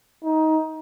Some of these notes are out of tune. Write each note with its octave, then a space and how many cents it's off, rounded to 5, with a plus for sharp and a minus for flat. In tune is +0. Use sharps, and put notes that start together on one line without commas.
D#4 +20